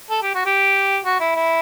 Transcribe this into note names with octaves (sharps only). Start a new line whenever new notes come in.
A4
G4
F#4
G4
F#4
E4
E4